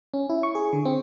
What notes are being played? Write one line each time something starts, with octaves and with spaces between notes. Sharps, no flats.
C#4
E4
C#6
G#4
D3
C4